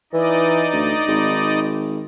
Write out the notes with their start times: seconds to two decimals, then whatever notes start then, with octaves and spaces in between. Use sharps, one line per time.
0.13 E3 D#4 D5 D#5
0.73 D2
1.07 G#1